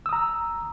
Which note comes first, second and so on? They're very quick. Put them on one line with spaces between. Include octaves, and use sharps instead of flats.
E6 D#6 A#5